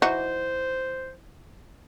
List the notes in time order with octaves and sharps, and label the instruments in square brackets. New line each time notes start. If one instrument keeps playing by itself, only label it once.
[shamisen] E3 D#4 F#4 [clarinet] C5